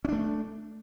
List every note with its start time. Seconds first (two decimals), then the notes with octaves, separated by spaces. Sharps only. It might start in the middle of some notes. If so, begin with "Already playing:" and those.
0.05 C#4
0.09 D4
0.12 A3